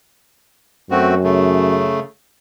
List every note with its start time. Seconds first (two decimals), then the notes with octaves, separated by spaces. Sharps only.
0.91 F#2 A3 C4 F#4
1.23 C#3 A3